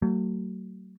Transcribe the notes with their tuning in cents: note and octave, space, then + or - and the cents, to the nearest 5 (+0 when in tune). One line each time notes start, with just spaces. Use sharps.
F#3 +30 A3 +40